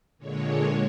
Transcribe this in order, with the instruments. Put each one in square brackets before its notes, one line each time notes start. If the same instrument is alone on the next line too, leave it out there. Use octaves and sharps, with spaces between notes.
[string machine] A#2 D3 G#3 C#5